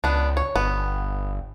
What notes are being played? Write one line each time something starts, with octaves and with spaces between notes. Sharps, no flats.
C#2 B3 D4
C#5
G1 B3